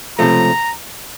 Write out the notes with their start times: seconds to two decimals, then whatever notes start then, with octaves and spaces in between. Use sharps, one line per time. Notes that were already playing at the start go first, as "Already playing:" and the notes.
0.19 C#2 C3 F3 A3 A#5